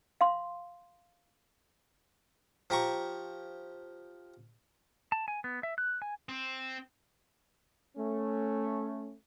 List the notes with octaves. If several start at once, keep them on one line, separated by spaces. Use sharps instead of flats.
F5 C6
F3 G4 A#5 C#6
A5
G#5
B3
E5
F#6
G#5
C4
A3 C#4